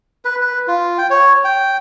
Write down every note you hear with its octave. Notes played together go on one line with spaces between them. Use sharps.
B4
B4
F4
G5
C#5
G5